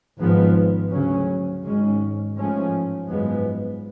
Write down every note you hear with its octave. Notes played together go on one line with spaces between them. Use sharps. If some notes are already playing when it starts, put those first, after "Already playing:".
G#1 G#2 F3 B3
D2 C#3 F#3 C#4
G#1 G#2 G#3 C#4
A1 G#2 F3 A3 C#4
G#1 F#2 F3 G#3 B3